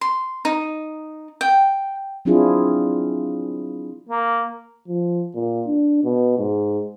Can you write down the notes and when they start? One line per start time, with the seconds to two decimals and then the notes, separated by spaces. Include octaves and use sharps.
0.01 C6
0.45 D#4
1.41 G5
2.25 F#3 C4 D4 E4 F4 G#4
4.09 A#3
4.88 F3
5.35 A#2
5.67 D4
6.04 B2
6.38 G#2